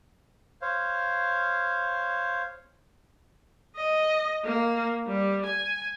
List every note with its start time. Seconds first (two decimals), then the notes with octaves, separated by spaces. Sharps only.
0.62 C5 C#5 F5
3.76 D#5
4.44 A#3
5.07 G3
5.45 G#5